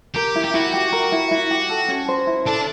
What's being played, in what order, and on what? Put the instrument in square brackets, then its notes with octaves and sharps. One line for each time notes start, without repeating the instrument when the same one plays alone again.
[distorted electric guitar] G4 [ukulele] A#4
[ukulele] E4
[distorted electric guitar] G4
[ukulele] E4 [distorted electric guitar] F#4
[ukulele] G4
A#4
E4
E4
G4
A4
C#4
C5
E4
[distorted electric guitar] D4 [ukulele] A4